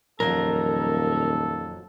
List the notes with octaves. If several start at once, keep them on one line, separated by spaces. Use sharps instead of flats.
D#1 F2 F3 F#3 A4 A#4